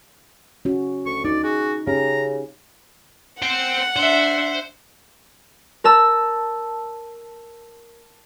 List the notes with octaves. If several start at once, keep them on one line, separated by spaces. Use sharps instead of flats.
C#4 F#4
D2 C#6
D#4 D5
F#4 G#4
C#3 C#4 G4 A#5
C5 F#5 G5
D4 C5 E5
A#4 A5 E6